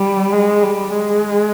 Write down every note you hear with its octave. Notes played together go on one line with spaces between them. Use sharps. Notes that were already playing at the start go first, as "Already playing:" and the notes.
Already playing: G3
G#3
G3
G#3